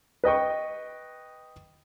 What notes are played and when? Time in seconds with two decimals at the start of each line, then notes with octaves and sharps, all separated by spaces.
0.24 B4 D#5 G5 C#6